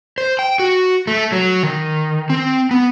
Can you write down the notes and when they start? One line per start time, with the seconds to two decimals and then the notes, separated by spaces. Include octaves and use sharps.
0.18 C5
0.39 G5
0.60 F#4
1.07 A3
1.32 F#3
1.63 D#3
2.30 C4
2.71 B3